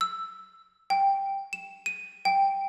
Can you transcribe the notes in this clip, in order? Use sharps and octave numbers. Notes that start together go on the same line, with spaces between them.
E6
G5
E7
D#7
G5